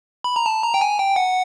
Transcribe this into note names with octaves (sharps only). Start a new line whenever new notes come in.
B5
A#5
A5
A#5
G5
G#5
G5
F#5